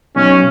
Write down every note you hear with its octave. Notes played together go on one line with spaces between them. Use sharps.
B1 C#4